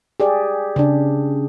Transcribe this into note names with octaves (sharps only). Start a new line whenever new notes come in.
G4 G#4 D5
C#3 D4